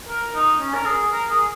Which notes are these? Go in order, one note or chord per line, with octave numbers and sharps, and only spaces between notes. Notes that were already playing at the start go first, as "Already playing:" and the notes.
A#4
D#4
C#4
A#4
G#4
A#4
G#4